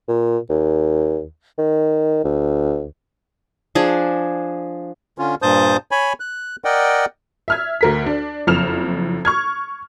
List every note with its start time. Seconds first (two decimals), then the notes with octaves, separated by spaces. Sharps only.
0.08 A#2
0.49 D#2
1.58 D#3
2.24 D2
3.75 F3 D4 G#4
5.18 D3 C#4 F4
5.42 G2 A#2 C5 A5 D#6 G6
5.91 C#5 G#5 B5
6.20 F#6
6.64 A#4 D5 D#5 F#5 G5
7.48 E5 F6 G#6
7.81 D2 A#4 B6
8.06 D4
8.47 F#1 F2 F6 E7 F7
9.25 C#6 F6 G#6